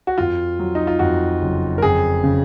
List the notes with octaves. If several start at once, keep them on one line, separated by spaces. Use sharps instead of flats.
F#4
F2 F4
F#3
D#4
F4
F2 F#4
F#1
A#4
F2 G#4
C#3